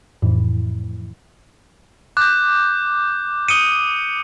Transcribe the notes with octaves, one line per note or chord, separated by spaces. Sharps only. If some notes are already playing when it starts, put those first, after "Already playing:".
F2 A2 E3
D6 F#6 G6
D#6 C#7 D#7 G7